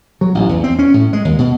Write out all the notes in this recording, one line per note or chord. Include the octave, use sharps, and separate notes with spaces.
F#3
A1
E2
C4
C#4
A2
G#3
D#2
B2